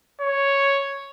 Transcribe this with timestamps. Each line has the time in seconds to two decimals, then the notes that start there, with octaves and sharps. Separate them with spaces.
0.21 C#5